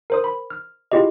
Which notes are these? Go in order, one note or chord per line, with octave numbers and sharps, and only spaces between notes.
A#4 C5 D#6
B5
F6
E4 F4 G4 G#4 D#5